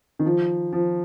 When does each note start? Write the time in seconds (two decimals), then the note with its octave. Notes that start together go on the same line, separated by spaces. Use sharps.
0.19 D#3
0.25 F3
0.73 F3